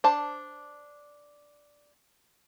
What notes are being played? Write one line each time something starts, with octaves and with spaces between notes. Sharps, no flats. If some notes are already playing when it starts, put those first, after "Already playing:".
D4 C5 A5